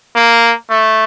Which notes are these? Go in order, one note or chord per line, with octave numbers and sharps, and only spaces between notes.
A#3
A3